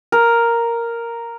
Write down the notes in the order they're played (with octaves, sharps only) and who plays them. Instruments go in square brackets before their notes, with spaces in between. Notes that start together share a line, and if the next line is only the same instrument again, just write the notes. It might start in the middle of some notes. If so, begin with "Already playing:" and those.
[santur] A#4